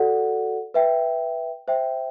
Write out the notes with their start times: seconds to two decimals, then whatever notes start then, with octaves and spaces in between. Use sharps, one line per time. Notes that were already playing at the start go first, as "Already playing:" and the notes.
Already playing: F#4 A4 D5 F#5
0.74 B4 E5 G5
1.68 C5 E5 G5